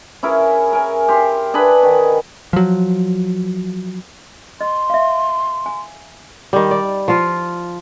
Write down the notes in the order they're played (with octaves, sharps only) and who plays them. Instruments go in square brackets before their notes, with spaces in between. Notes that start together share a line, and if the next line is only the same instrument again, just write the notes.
[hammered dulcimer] C#4 E4 G#4 A#4
A#4 G#5
G4 C6
D4 G#4 B4 B5
D#3
[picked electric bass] F3 F#3
[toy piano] D#5 [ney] C6
[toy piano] E5 F5
G#5
[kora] D#3 G3
D5
F3 F4